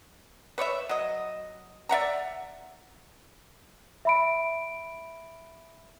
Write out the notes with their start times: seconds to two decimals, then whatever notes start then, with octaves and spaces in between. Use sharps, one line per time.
0.58 B4 C#5 D5 E5
0.89 F#3 D#5
1.89 D5 E5 F#5 A#5
4.05 E5 B5 D7